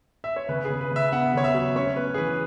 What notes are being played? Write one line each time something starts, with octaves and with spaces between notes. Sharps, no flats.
E5
C#5
C#3 B4
G#4
C#3
B4
C#3 E5
B3 F#5
C#3 C#5
E5
F#3
C#4 C#5
C#4 B4
G#4
E3 B4